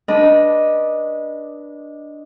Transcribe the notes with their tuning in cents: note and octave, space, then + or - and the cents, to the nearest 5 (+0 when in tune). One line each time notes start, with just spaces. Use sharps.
D4 +0 B4 -30 D#5 +0